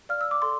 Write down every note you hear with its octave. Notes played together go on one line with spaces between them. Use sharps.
D5 F5 F6
E6
D6
A4 C6